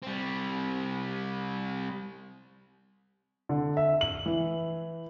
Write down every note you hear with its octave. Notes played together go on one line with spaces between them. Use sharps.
G3 C4
D3
E5
F#7
E3